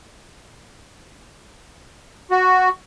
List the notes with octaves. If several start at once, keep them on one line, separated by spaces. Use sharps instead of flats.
F#4